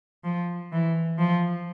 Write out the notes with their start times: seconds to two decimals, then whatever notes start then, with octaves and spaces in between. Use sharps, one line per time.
0.24 F3
0.72 E3
1.18 F3